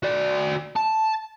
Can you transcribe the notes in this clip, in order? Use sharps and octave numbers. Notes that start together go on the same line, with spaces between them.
F#4 D5
A5